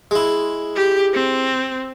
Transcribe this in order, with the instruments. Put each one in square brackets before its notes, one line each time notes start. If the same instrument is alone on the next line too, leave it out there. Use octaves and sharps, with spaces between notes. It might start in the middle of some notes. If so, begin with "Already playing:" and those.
[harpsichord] G#3 E4
[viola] G4
C4